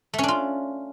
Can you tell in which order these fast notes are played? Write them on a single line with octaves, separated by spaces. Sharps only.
A3 C#4 D4 F4